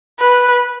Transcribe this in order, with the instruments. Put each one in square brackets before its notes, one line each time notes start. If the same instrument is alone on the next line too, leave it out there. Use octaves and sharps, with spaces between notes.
[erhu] B4